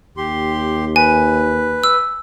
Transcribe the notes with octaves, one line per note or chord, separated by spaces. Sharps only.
D#2 G4 C6
B4 G#5
E6